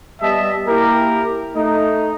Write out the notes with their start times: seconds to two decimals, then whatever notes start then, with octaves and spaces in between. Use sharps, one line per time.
0.22 G3 B3 D#5 E5 A5
0.68 A#3 E4 G4 A#4
1.56 A3 D#4